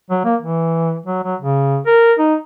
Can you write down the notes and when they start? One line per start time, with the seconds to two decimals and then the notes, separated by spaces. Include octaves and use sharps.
0.10 F#3
0.25 A#3
0.42 E3
1.06 F#3
1.24 F#3
1.41 C#3
1.86 A#4
2.19 D#4